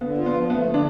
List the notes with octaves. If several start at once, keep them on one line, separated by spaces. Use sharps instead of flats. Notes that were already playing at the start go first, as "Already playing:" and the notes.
D3 B3
F4
B3
F3
A3 B3
D3
D4